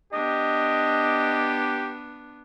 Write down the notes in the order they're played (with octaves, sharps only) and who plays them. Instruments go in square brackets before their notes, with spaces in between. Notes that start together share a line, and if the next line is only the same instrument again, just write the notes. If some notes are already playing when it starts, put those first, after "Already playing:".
[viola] B3 D4 [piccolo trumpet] G4 [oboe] D#5